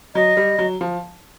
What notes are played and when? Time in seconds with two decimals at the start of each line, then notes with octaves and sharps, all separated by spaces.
0.15 F#3 D#5
0.37 G3
0.58 F#3
0.81 F3